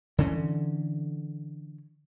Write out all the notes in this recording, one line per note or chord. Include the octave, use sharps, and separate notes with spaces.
D3 E3 C#4